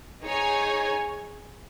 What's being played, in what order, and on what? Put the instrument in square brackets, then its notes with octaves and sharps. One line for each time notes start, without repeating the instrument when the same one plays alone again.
[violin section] D#4 G#4 C#5 G#5